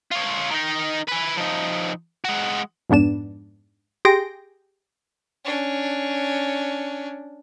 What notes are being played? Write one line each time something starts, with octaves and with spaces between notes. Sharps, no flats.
F4 C#5
D#3 D#4
B4 G#5
F3 D#4
G#3 F#4
F2 G#2 B3 D4 E7
G4 G#4 G5 C6 A#6 D7
C#4 D4